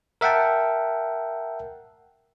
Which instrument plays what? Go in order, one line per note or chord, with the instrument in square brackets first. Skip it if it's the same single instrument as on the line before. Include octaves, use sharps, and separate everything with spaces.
[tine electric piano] A#4 E5 F#5 G5 A5